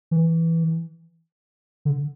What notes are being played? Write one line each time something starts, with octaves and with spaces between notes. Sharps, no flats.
E3
D3